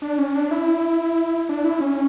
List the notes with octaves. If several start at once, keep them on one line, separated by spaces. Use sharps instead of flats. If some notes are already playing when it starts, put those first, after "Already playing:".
D4
C#4
D4
E4
D4
E4
C#4